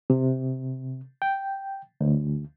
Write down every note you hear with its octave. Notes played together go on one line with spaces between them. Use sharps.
C3
G5
D2